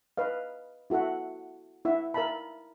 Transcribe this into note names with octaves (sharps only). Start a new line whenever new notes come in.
B4 D#5 F5
E4 F#4 A4 E5 F#5
E4 E5 F#5
A#4 E5 F5 A5 B5